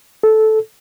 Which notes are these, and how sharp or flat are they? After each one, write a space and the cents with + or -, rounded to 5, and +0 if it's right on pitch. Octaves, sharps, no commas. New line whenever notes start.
A4 -10